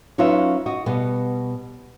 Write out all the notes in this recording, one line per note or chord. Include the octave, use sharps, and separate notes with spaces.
F#3 C#4 D#4 F4 B4 E5
F#4 D#5
B2 G3 B3